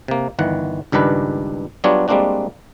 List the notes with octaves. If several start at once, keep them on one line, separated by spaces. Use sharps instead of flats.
C3 A#3
G1 D#3 E3 F#5
C#2 G2 D#3 D4 B4
F#3 G3 B3 D4 F4 C#5
G3 G#3 A#3 C4 D4 F#4